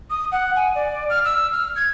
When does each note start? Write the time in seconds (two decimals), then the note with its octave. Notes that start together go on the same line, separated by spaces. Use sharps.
0.10 D#6
0.32 F#5
0.56 G#5
0.75 D5
1.10 F6
1.25 E6
1.52 F6
1.76 G#6